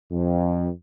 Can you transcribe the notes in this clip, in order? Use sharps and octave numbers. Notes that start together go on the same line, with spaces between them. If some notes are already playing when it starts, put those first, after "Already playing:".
F2